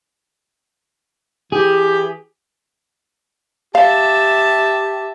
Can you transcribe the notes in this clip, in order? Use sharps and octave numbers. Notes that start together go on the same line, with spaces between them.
E3 G4 G#4
G4 E5 F5 A5